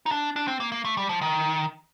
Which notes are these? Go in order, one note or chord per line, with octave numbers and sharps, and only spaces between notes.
D#4
D4
D4
C4
A#3
A#3
A3
G3
F3
D#3